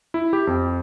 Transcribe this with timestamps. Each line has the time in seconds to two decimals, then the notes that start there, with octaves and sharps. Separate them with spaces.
0.14 E4
0.33 G4
0.47 F2